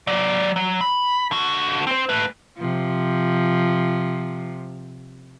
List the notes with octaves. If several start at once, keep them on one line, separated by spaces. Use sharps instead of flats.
F#3 D5
F#3
B5
D3 F#4
C4 C5
A3 B4
C3 F3